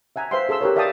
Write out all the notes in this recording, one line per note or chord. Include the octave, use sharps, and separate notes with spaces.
E5 F#5 G#5 A#5
B4 C5 E5 F5 G5 C6
G#4 A4 C6 E6
G4 A#4 B4 C#5
D5 E5 F5 G5 A5 D#6